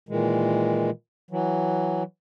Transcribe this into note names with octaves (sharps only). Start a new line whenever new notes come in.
A#2 D#3 E3 G#3
E3 F#3